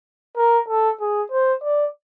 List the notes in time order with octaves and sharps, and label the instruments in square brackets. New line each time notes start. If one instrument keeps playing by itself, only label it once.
[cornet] A#4
A4
G#4
C5
D5